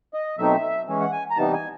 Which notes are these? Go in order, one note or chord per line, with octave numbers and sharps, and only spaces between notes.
D#5
B2 F#3 A3 C4 D#4 E5
E3 G#3 C#4
F#5
G#5
A#5
C3 E3 G3 B3 D#4 A5
G#5